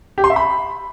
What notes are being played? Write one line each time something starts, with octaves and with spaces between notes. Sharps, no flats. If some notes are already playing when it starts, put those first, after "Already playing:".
G4
C6
E5
B5